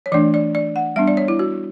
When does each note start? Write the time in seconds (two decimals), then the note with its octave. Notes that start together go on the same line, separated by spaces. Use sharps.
0.06 C#5
0.12 E3 A3 D4 D5
0.34 D5
0.55 D5
0.76 F#5
0.96 G3 B3 D4 E5
1.08 D5
1.17 C#5
1.28 E4
1.39 F#4